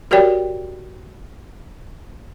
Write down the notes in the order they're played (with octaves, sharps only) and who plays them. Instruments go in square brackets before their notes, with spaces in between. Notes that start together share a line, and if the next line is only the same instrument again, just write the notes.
[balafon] F#4 G4 A#4 C#5 D5 G5